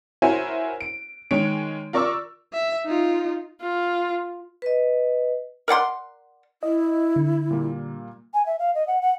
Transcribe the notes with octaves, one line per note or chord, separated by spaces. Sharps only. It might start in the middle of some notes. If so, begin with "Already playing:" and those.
E4 F#4 A#4 C5 C#5 G#5
D7
D#3 G#3 C#5 D7
F4 A#4 D5 C#6 D6 E6
E5
D#4 F4
F4
B4 D#5
A#4 D5 F#5 C6
E4 D#5
D3
A#2 G3 A#3
G#5
E5
F5
D#5
F#5
F#5